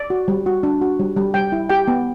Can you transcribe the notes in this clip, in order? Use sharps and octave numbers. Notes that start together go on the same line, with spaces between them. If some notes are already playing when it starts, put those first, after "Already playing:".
Already playing: D5
F#4
G3
F#4
D4
F#4
G3
G3
G3 G5
E4
G4 G5
B3